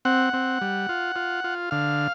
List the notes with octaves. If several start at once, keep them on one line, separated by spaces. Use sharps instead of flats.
C4 F#5
C4
G3
F4
F4
F4
D3 F5